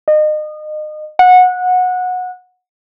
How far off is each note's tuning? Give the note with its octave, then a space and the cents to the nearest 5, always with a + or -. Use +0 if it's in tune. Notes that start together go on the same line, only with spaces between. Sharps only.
D#5 -30
F#5 -20